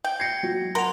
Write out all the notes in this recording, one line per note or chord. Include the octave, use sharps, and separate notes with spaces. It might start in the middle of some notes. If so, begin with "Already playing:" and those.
G5
G#6 A#6 C7 C#7
F#3
A#4 F#5 C6 F7